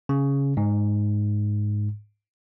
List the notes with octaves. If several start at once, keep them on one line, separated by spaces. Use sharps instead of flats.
C#3
G#2